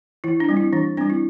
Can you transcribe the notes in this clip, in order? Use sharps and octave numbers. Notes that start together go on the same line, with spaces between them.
E3 E4
D4
G3 C4
E4
E3 D4
G3 C4 D4
E4